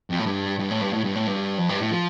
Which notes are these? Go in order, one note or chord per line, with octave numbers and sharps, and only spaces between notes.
F2
A2
G2
G2
A2
G2
A2
G2
A2
G2
F2
G2
A2
F3